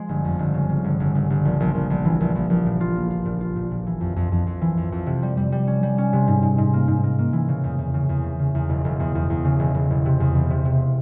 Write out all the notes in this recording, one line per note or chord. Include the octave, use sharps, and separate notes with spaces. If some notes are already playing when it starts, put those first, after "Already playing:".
Already playing: F3 G#3
G1
F2
G1
C#3
C#3
G1
G1
G1
G1
A#1
A#1
A#1
A#1
E3
A#1
A#1
A#1
A#2
F4
A#3
F4
A#2
F4
A#2
A#2
E3
F2
F2
F2
F2
E3
F2
F2
C3
G3
G3
G3
C#4
G3
C#4
C3
G#2
G#2
G#2
A#3
G#2
A#3
A#3
E3
C#3
E2
E2
C#3
E2
C#3
C#3
E2
E1
E1
E2
E2
E2
C#3
E1
E1
E1
C3
E2
E1
C3
C3